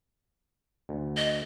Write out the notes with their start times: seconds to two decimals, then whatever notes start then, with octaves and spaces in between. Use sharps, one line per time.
0.89 D2
1.17 D#5